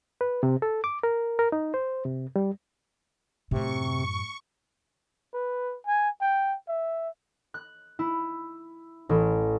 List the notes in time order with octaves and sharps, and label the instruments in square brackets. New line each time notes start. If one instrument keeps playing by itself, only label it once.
[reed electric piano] B4
C3
A4
D6
A#4
A#4
D#4
C5
C3
G3
[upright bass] F#2 A2 [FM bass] C3 [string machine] C#6
[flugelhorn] B4
G#5
G5
E5
[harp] F#6
E4
A1